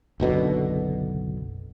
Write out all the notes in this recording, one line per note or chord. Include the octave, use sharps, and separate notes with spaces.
F#1 B1 B2 D3